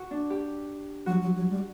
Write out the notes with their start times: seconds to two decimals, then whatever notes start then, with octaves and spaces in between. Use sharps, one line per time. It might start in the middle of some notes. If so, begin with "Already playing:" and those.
Already playing: F#4
0.11 D4
0.30 G4
1.06 F#3 F#4
1.22 F#3
1.36 F#3
1.50 G3